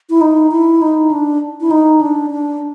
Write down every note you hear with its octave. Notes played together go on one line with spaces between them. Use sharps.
E4
D#4
E4
D#4
D4
E4
D#4
D4
D4